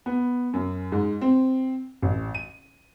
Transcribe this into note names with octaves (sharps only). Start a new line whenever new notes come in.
B3
F#2
G#2
C4
A1
D#7